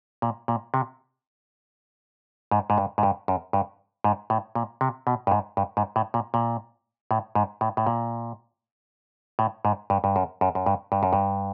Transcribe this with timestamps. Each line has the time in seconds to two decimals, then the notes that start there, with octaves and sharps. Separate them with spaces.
0.22 A#2
0.48 A#2
0.74 C3
2.51 G#2
2.70 G#2
2.78 G2
2.98 G#2
3.03 G2
3.28 F#2
3.53 G2
4.04 G#2
4.30 A2
4.55 A#2
4.81 C3
5.07 B2
5.27 G2
5.32 G#2
5.57 G2
5.77 G#2
5.96 A2
6.14 A#2
6.34 A#2
7.11 A2
7.35 G#2
7.61 A2
7.77 A2
7.87 A#2
9.39 A2
9.65 G#2
9.90 G2
10.04 G2
10.16 F#2
10.41 F#2
10.55 F#2
10.66 G2
10.92 G2
11.03 F#2
11.13 G2